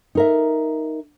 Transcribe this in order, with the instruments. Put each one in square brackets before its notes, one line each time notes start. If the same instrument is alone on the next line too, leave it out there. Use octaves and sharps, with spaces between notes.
[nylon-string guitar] D#4 A#4 E5